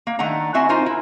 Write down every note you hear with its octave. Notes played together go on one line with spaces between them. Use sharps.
A#3
D#3 A3 D4 F#5 A#5
C4 E4 F#4 E5 G#5
D#4 F4 A#4 C5
E4